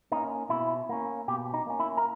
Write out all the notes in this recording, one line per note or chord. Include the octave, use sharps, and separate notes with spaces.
A#3 C#4 D#4
B2 E4
A#3 C#4
B2 G4
D#4
A#3 C#4
E4
A#4